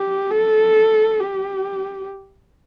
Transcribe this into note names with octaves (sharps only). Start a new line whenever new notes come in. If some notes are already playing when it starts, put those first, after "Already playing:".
Already playing: G4
A4
G4